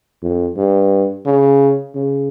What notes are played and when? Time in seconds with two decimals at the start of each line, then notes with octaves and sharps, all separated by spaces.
0.23 F2
0.57 G2
1.26 C#3
1.95 C#3